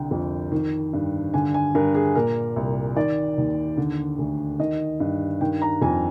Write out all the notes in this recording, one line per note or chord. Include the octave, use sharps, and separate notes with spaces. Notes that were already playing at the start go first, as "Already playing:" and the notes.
Already playing: C2 D3 G5
F2
D#3
G2
D3 G#5
G#5
G2 A#4
G#4
A#2 A#4
C2
D#3 D5
D#2
D3
D2
D#3 D#5
G2
D#3 G5
A#5
F2 G#5